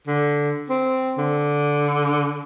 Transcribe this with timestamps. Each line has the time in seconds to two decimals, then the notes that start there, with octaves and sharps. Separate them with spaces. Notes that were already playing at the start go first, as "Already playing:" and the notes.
0.07 D3
0.70 C4
1.18 D3